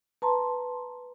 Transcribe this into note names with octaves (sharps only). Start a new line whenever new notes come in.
B4 A5 A#5 C6